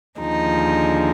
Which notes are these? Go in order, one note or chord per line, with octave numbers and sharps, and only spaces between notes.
D#2 D3 F3 G#3 D#4